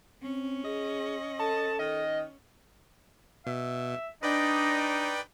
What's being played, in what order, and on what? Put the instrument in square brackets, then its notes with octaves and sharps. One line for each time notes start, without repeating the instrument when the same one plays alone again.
[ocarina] C4 [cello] C#4
[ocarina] G#4 [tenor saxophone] D#5
[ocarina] A4 [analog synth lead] A5
[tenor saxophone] D#3 [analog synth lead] D#5
[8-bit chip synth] B2 [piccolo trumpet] E5
[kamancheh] D4 [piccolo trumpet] D#4 [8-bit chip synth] B4 D5 G5 [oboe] D#5